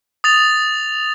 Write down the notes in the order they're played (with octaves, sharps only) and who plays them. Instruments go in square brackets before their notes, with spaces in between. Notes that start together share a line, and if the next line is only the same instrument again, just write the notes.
[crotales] D#6 A6 F7